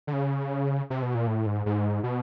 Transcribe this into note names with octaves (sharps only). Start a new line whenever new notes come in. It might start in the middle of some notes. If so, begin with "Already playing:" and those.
D3
C#3
C3
B2
A#2
A2
G#2
G#2
B2